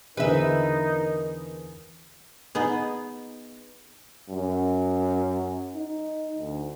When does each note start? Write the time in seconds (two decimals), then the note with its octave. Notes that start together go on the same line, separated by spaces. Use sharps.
0.17 E2 D3 D#4 G#4 A#4 B4 E5
2.55 B3 D#4 G#4
4.30 F#2
5.76 D#4
6.38 D2